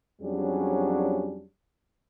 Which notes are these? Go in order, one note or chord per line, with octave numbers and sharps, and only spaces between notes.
F2 F#3 G3 C#4 D4 G#4